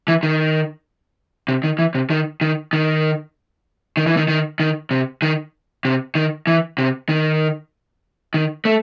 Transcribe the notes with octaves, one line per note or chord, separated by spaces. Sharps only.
E3
D#3
C3
D#3
E3
C3
D#3
D#3
D#3
D#3
E3
D#3
D#3
D#3
C3
D#3
C3
D#3
E3
C3
D#3
D#3
A3